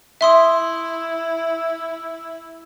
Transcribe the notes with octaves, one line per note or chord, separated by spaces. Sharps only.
E4 E5 C6 D#6